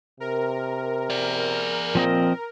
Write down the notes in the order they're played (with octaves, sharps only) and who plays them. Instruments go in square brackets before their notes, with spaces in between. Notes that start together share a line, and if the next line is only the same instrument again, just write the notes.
[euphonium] C3 [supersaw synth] A#4
[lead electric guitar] G#4 D5
[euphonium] A#2 [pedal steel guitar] F3 C4 D#5